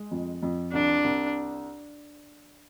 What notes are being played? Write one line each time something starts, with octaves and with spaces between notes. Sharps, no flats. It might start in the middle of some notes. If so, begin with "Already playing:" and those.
Already playing: G#3
F2
F2
C2 D4
C2